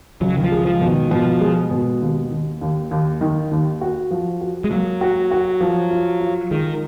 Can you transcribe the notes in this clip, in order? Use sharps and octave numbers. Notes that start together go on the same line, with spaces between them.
C#2 F#3
D#3
F3
G#3
F3
B2
D#3
B2 F3
G#3
B2
D#2
D#2
D#2
D#2
D#3
D#2
F#4
F3
F#4
G#3
F#3 A#3
F#4
F#4
F3
F4
F4
D#3 G#3